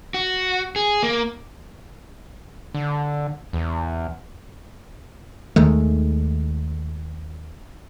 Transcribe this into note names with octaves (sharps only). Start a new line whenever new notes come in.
F#4
G#4
A#3
D3
E2
D#2 D#3 G#3 A3